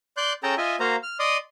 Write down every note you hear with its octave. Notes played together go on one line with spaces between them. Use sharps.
D5 C6 F#6 G6
C#4 G#4 A4 G5 A5 A#5
F4 D#5 E5 G#5
A#3 F#4 C5 F5 A#5
F6
D5 D#5 C6 D#6